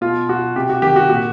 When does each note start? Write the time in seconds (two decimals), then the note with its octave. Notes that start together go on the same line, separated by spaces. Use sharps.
0.01 B2 F4
0.29 F#4
0.55 C3 G4
0.69 F#4
0.82 D#3 G4
0.96 F#4
1.10 A#2 F#4